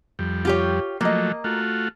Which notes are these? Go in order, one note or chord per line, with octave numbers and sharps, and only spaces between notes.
F2 G3
F4 G4 C#5
F3 F#3 A3 A#3 D#5
A3 F4 F#4